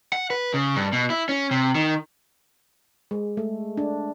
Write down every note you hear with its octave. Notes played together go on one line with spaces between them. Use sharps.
F#5
B4
C#3
G2
B2
E4
C#4
C3
D#3
G#3
A3
D4